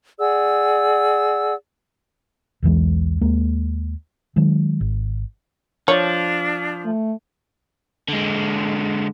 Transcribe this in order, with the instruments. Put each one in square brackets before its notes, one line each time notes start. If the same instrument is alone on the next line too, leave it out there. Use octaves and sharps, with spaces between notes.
[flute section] G#4 D5 F#5 E6
[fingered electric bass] B1 E2 E3 G#3
D#2 G#3 A#3
D#3 F#3 G#3
G#1
[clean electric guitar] F3 [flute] D4 [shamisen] C#5
[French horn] A3
[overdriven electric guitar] D3 G#3